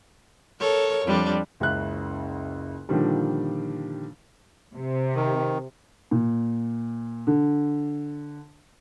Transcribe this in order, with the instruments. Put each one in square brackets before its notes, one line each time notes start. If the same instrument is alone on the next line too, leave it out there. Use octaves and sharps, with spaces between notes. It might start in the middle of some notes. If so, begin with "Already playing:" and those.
[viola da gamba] A4 A#4 C#5
F2 G3 D4
[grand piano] F#1 C#2 C#3 E5 F#6
A#2 D3 D#3 F3 G3
[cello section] C3
[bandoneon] D#3
[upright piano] A#2
D3